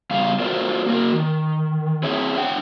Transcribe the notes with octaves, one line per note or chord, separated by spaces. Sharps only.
C#3 G3 B3 F5
F4 F#4 A4 A#4 C5 D5
A#3 F#4 A#4
D#3
C4 E4 G#4 C#5 E5
D4 F#5 G5